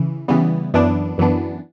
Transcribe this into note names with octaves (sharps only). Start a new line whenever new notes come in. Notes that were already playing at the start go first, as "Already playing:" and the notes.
Already playing: C#3 E3
C#3 E3 G3 B3
F#2 E3 B3 D4
F#2 E3 B3 D4